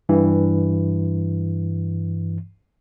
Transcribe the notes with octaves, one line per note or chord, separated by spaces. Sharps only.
G2 E3